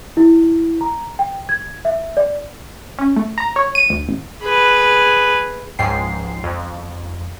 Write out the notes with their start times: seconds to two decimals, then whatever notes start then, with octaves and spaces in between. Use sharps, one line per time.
0.17 E4
0.81 A#5
1.19 G5
1.49 G#6
1.85 E5
2.17 D5
2.99 C#4
3.16 A3
3.38 A#5
3.56 C#5
3.75 D#7
3.90 D2
4.08 A1
4.42 G#4 B4
5.79 C#2 G#2 F3 G5 C7
6.44 F2